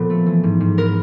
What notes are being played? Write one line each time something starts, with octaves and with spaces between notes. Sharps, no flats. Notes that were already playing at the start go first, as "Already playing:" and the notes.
Already playing: A#2 F3 B3 A4
A3
E3
G#2
G#2
B3 A#4